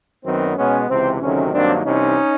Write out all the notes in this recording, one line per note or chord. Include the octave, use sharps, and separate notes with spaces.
F#2 D#3 F#3 B3 C4
B2 G#3 B3 C#4
C#2 C3 E3 C4
D2 C3 D#3 F#3 A3 C#4
G2 D#3 F#3 A#3 C4 D4
C2 C3 E3 C#4 D#4